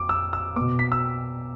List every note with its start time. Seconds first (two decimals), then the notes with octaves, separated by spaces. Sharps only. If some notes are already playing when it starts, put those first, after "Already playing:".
Already playing: F2 D6
0.09 E6
0.33 E6
0.56 B2 B3 D6
0.79 B6
0.92 E6